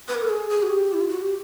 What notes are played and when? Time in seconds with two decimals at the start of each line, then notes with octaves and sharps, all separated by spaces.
0.08 B4
0.15 A#4
0.22 A4
0.30 G#4
0.50 G#4
0.63 F#4
0.70 G4
0.93 E4
1.01 F4
1.09 F#4
1.21 G4